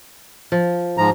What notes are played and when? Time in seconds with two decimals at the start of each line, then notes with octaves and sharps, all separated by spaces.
0.52 F3
0.98 G#2 F3 A#5